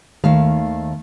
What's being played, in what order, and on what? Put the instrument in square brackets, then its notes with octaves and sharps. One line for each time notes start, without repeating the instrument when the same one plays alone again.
[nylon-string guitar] D#2 A3 F5 [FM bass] D#3